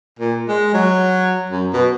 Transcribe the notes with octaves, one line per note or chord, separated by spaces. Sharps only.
A#2
G#3
F#3
F#2
B2